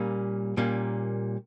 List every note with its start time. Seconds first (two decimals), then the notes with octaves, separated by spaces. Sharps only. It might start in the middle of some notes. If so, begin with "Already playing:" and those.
Already playing: A#2 G3 A#3 C#4
0.57 A#2 G3 A#3 C#4